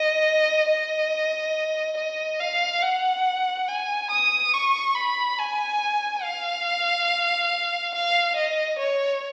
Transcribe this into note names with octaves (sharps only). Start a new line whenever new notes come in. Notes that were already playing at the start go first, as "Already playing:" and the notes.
Already playing: D#5
D#5
D#5
F5
F#5
G#5
D#6
C#6
B5
G#5
F5
F5
D#5
C#5